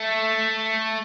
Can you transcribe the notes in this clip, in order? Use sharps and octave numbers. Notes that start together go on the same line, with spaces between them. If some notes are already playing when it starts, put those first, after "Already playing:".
Already playing: A3